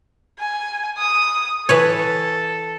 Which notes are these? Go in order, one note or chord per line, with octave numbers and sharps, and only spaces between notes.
G#5
D#6
E3 A4 B4 C#5